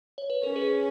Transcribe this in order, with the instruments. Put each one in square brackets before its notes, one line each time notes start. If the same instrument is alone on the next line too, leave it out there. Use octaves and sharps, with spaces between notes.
[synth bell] C#5
B4
[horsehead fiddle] C#4 [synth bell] A#4
[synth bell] G#4 B4